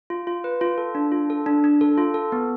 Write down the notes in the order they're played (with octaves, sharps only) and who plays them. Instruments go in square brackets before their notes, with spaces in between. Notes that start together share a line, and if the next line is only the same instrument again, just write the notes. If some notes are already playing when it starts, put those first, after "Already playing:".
[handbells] F4
F4
B4
F4
A4
D4
F4
A4
D4
D4
A4
F4
A4
B3